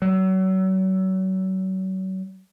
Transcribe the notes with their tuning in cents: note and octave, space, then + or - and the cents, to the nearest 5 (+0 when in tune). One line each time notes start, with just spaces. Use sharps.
F#3 +35